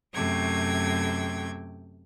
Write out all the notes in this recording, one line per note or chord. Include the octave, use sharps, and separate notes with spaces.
F#2 C3 A3 G5 G#6